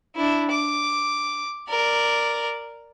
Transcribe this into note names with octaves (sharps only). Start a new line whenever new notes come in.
D4 E4
D6
A#4 D5